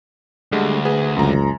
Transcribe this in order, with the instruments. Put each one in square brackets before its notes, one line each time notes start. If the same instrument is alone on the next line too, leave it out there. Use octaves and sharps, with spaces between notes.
[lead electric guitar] D2 [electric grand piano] D3 G3 G#3
[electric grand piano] G#4 B4
[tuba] C#2 [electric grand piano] F#2 A#5